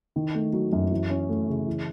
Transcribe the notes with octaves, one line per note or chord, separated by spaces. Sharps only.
D#3
A3
F#3
F#2
E3
C#4
A3
C#3
E3